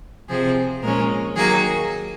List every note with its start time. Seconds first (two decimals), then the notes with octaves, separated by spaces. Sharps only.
0.30 C3 F3 C4 G#4
0.82 A#2 F3 G#3 C#4 A#4
1.36 D#3 F#3 A#3 G#4